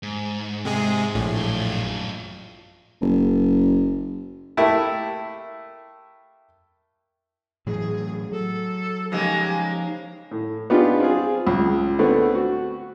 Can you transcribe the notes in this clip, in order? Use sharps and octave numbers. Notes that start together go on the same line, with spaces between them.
G#2
C3 G#3 G#4
A#1 A2
F#2 F4
F#1
A3 A#3 E4 G4 A5
A2 E3 F#3 G#4
F#3 A4
C#3 F3 G#3 A#3 D#4 G4 F5
A2
B3 D4 D#4 F4 G4 G#4
C4 F4 G#4
C#2
D3 A3 B3 C4
F#4